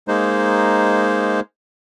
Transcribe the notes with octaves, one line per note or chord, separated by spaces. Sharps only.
G#3 A#3 D#4 C5